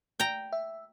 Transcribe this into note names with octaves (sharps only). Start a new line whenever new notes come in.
G5 A#5
E5